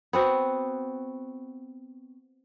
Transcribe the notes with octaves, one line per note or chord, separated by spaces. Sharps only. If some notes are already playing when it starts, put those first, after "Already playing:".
B3 C4 F#4